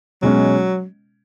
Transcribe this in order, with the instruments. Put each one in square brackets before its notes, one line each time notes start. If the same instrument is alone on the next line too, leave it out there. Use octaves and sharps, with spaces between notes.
[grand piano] B2 G#3 C#4 [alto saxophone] F#3